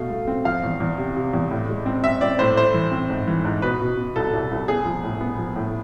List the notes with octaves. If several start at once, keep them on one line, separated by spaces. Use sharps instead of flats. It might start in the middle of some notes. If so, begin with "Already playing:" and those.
Already playing: B2 A3 F5
A3
C4
F3 F5
E2
E2
C3
C3
E2
A2
G#3
C4
C4 E5
C4 D5
A2 C5
A3 C5
E3
C4
G#2
E3
G#2
B2 B4
B2
B2
C2 A4
C2
C2
B3 G#4
F3
A2
B3
F3
A2